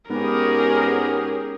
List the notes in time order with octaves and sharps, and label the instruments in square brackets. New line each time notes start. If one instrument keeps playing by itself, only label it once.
[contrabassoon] G#2 [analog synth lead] B3 [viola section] C#4 G4 G#4 [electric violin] A#4